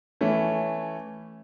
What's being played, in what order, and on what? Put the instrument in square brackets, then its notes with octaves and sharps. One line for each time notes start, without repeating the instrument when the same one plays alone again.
[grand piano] E3 A3 C#4